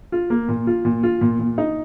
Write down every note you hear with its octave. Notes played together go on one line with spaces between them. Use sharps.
F4
A#3
A#2
F4
A#2
F4
A#2
A#2
D#4